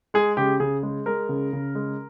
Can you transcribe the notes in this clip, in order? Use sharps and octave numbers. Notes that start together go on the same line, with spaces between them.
G#3 G#4
C#3 G4
C#3 G#4
G#3
G#3 A#4
C#3
C#3
G#3